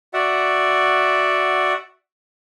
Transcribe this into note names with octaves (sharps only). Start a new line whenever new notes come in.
F#4 D5 E5 F#5